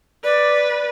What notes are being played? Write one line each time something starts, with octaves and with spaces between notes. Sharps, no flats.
B4 D5